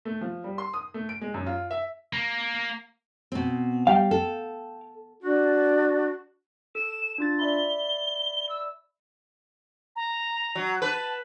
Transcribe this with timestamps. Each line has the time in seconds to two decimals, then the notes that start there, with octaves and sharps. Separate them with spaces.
0.05 A3
0.21 F3
0.44 G3
0.58 C6
0.74 D#6
0.94 A3
1.09 D7
1.21 G#3
1.34 F#2
1.46 F4
1.71 E5
2.13 A#3
3.32 B2 C4
3.87 G3 F5 G5
4.11 A4
5.23 D4 F#4
6.75 A4 E7
7.18 D4 F4 A6
7.39 D5 E5 B5 G7
8.49 E6
9.96 A#5
10.55 F#3
10.82 B4 A5